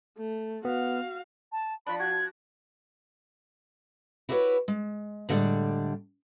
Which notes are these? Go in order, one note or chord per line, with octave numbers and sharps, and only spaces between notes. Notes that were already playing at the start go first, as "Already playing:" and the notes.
A3
B3 F#4 F5
A5
F3 D4 B5
F#4 G#6
E4 F#4 G4 A4 B4 C#5
G#3
A2 D3 G3 G#3 D5